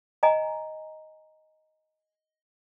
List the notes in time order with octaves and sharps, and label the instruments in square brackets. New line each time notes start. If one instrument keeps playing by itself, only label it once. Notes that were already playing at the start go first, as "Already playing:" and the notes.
[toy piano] D#5 G#5 A#5